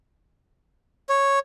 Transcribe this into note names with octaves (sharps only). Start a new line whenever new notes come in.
C#5